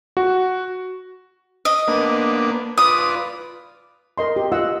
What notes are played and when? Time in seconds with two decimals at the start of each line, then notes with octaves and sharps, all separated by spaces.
0.17 F#4
1.65 D#5
1.88 A#3 B3 D4
2.78 F4 B4 D5 D#6
4.18 A#4 D#5 C6
4.36 G4
4.52 F4 D#5 F#5 E6